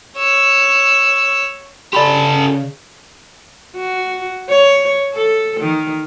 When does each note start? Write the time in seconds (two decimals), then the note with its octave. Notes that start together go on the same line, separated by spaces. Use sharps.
0.17 C#5 E6
1.93 C#3 G4 A4 D5 B5 C6
3.77 F#4
4.49 C#5
5.14 A4
5.60 D#3